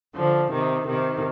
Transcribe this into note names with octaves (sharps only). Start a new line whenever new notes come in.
D3 F3
C3 D#3
C3 D#3